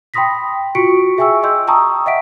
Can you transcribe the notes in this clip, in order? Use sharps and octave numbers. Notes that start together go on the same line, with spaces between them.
G5 B5 C6 D#6 A#6 B6
F4 F#4 C#6 B6 C#7 D7
G#4 E5 G5 G#5 C#6 E6
D#5 C6 E6 G6
G5 A5 A#5 C#6 D#6 E6
D#5 E5 F#5 B6 D7